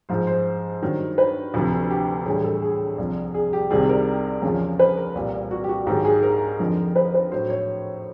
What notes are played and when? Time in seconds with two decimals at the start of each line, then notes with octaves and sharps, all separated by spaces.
0.09 G#2 F3 C5
0.27 C5
0.82 G2 D#3 F#3
1.18 B4
1.54 D2 C3 F3
1.90 G4
2.26 A2 E3 G3 G#4
2.44 A4
2.62 G#4
2.98 C2 C3 F3
3.34 G#4
3.53 G4
3.70 C2 C3 D#3 G3 G#4
3.89 A#4
4.42 E2 C#3 F3
4.79 B4
4.97 A#4
5.15 C2 A#2 G3
5.51 F#4
5.64 G4
5.69 F#4
5.87 G#2 D#3 F#3 G4
6.05 G#4
6.23 A#4
6.59 F2 D3 F3
6.96 B4
7.14 B4
7.32 A2 F#3 C5
7.50 C#5